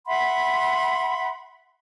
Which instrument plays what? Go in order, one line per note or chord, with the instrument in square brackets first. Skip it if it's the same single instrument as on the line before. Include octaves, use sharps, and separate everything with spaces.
[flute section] E5 F#5 B5 C6